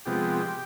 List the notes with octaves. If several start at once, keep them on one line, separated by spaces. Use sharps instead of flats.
C3 F3 G#3 B3 G4